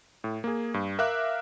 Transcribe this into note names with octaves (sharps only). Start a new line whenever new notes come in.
A2
A#3 G#4
G2
A#4 E5 F5 D6 F#6